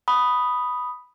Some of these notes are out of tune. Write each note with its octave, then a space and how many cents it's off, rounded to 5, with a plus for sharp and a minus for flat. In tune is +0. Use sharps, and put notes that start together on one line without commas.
B5 +0 D#6 +0